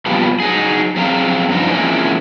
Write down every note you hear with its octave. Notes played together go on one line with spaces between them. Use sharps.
A#2 F3 G3 B3
F#3 D#4 G#4
F2 F#3 C4 G#4 F5 A#5
G2 F3 D#4
E3 F3 G#3 A#3 C4 C#4